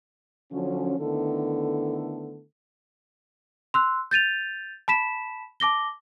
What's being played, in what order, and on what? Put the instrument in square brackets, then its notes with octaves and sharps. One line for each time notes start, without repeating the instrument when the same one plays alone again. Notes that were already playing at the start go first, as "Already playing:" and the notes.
[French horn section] D3 F3 F#3 C#4
D3 D#3 A3 B3 E4 A4
[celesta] C6 E6 F#6
G6 A6 D#7 F7
A5 B5 B6 E7
A5 D6 A#6 G7